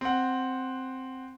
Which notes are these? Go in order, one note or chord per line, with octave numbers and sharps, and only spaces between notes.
C4 F#5